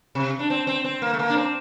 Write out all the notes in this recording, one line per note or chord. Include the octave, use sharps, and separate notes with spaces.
C3
D4
C4
C4
C4
A#3
A3
A#3
D4
C4